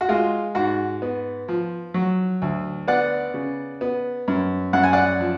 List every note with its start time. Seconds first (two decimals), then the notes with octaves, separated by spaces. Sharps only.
0.01 F#4
0.09 G#3 F4
0.55 G#2 F#4
1.02 B3
1.48 F3
1.94 F#3
2.42 D2
2.88 B3 D5 F#5
3.34 C#3
3.81 B3
4.28 F#2
4.73 F#2 F#5
4.83 G#5
4.93 D5 F#5
5.20 F3